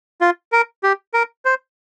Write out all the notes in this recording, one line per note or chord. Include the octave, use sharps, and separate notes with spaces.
F4
A#4
G4
A#4
C5